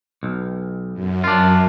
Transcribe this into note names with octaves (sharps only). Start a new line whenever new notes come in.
B1
F#2
D4 F4